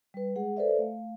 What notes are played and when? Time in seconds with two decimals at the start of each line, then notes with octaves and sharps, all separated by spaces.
0.14 G3 B4
0.36 G#3 G#4 F#5
0.57 A4 B4 C5 D5 E5
0.79 A3 F5